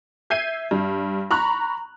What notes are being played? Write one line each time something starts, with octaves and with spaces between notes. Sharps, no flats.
E5 G6 G#6 C7 D#7
G2
A#5 B5 C#6 F#6